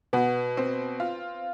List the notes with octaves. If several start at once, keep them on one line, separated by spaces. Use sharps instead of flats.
B2 B3
C4
F4